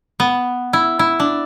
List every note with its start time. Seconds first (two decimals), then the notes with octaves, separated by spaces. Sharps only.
0.20 B3
0.73 E4
0.99 E4
1.20 D4